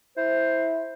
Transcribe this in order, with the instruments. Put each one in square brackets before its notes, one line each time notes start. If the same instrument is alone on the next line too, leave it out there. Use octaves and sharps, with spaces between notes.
[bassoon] E4 [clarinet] C5